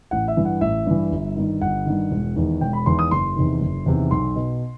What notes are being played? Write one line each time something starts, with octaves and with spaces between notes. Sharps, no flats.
A1 F#5
E5
G2 E3
F#5
A1 E5
G2 E3
G1
G2 D#3
G1 F#5
G2 D#3
E1
E2 D#3
E1 G5
B5
E2 D#3 C6
D#6
F#1 C6
E2 C3 D#3
F#1
E2 C3 D#3
B1 C6
B2